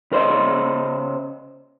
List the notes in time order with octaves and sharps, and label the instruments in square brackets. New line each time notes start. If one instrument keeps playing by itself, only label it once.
[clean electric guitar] C#3 A#4 C5 D5 D#5